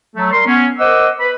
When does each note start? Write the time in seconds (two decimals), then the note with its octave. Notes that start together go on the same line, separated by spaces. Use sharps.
0.16 F#3 A3
0.32 G3 A#4 C6
0.47 B3 C#4
0.79 A#4 C5 D#5 F#5 D6 E6
1.19 B4 B5